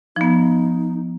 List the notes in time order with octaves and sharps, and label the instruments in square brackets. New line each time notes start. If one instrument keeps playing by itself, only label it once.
[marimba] F3 B3 [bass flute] D#4